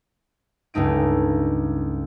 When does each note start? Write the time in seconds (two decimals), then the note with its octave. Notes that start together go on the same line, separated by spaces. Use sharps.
0.74 C#2 G2 A3 D#4 D7